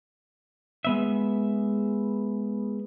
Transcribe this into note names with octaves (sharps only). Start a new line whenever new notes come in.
G#3 B3 E5